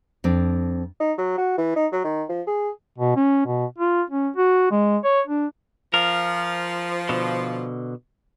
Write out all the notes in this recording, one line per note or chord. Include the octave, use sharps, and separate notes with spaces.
F2 C4 D4
D#4
F#3
F#4
E3
D#4
F#3
D#3
F3
G#4
B2
C#4
B2
F4
C#4
F#4
G#3
C#5
D4
F3 A#4
B2 D3